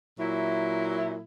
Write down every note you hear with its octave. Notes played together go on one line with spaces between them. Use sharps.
A#2 F#3 E4